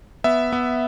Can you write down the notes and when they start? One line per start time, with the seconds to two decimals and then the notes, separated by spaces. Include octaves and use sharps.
0.24 B3 E5
0.52 B3